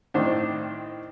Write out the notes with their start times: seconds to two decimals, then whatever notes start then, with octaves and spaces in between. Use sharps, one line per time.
0.14 A2 D#3 C4 D4